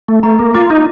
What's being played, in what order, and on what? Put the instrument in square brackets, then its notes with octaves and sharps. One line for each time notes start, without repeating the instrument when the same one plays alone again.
[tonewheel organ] A3
[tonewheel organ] A3 [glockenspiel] A#5
[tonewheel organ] A#3
[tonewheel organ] F4 [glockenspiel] D6
[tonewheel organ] D#4